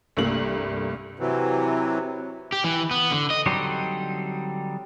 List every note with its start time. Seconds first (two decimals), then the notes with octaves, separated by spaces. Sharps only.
0.17 C2 G2 A3 A#3 F#7
1.19 C3 E3 F#3
2.52 G4
2.64 E3
2.91 B3
3.11 D3
3.30 D#5
3.46 D3 F#3 G3 C4 D#4 G4